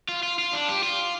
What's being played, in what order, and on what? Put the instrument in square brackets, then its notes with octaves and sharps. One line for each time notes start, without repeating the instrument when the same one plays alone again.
[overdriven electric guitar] F4
F4
F4
D4
G4
F4